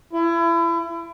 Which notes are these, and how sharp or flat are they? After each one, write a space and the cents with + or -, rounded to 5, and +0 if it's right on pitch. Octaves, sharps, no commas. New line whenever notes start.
E4 +30